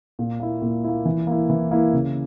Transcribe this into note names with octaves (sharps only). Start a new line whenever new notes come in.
A#2
A#3 E4
A#2
A#3 E4
E3
A#3 E4
E3
A#3 E4
C#3